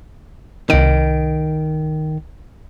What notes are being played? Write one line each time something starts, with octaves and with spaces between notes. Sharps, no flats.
C2 D#3 D7